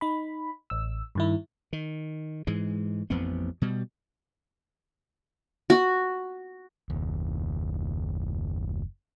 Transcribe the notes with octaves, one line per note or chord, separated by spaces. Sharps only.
D#4 B5
A1 E6
G2 D#3 E4
D#3
G#2 E3 G#3
A1 F2 B3 C4
B2 G3
F#4
F#1 D#2